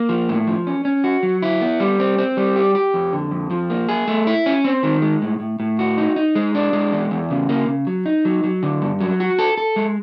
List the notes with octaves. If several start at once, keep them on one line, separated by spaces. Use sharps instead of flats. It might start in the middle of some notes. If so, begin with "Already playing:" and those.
Already playing: A#3
F3
A2
F3
C#4
C#4
F#4
F#3
E4
B3
G3
C4
C4
G3
G4
G4
F2
D3
F2
F3
A#3
G#4
A3
E4
C#4
C4
D#3
G#3
A2
A2
A2
F#4
D#4
D#4
G#3
D4
G#3
E2
E2
C#3
A#3
C#3
F#3
D#4
F#3
F#3
D3
G2
F#3
F#4
A4
A4
G#3